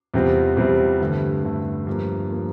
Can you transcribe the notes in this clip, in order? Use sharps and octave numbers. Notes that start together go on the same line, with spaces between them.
E2 C3 G3 C4 F4
E2 C3 G3 C4 F4
G2 D3 A3
G2 D3 A3
G2 F3 A#3
F3 A#3